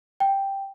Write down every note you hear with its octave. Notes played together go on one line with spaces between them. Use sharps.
G5